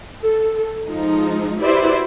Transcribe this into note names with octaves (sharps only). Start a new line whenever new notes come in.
A4
F3 G#3 D#4
E4 F#4 G4 B4 C5 D5